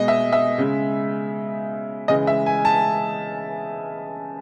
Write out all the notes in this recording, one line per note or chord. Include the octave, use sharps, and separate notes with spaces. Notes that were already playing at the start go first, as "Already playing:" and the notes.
Already playing: B2 G#3 D#5
E5
E5
C#3 G#3
C#3 E3 G#3 D#5
E5
G#5
A5